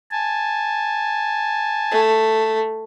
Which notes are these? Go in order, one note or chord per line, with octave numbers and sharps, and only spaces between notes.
G#5 A5
A3